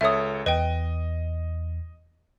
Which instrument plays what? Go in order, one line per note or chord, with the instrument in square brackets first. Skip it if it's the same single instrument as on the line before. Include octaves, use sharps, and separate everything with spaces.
[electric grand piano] C#2 A4 C#5 [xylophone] E5 D#6
[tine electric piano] E2 [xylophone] B4 G5 [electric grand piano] D#5